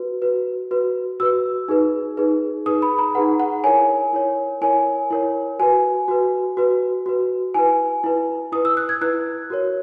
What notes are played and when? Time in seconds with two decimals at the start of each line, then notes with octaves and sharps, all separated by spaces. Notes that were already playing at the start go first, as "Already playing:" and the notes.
Already playing: F#4 B4
0.22 F#4 B4
0.71 F#4 B4
1.20 F#4 B4 E6
1.68 D#4 G#4 B4
2.17 D#4 G#4 B4
2.66 D#4 G#4 B4 D#6
2.82 B5
2.99 A#5
3.15 D#4 G#4 B4 F#5
3.40 F#5
3.64 E4 A#4 C#5 G#5
4.13 E4 A#4 C#5
4.61 E4 A#4 C#5 G#5
5.10 E4 A#4 C#5
5.59 F#4 B4 G#5
6.08 F#4 B4
6.57 F#4 B4
7.06 F#4 B4
7.54 E4 B4 G#5
8.04 E4 B4
8.52 E4 B4 D#6
8.65 E6
8.77 F#6
8.89 G#6
9.01 E4 B4 F#6
9.50 F#4 A#4 C#5